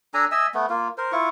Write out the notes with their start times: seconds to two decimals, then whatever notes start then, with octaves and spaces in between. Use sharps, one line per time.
0.14 D4 A4 G#5 A#5
0.31 D#5 E5 G#5 E6
0.54 A3 B3
0.70 A#3 F4
0.98 A#4 C5
1.12 E4 F4 C#6